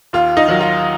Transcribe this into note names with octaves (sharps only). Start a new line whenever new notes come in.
D#2 F4
D#4
D#3 F#3
F4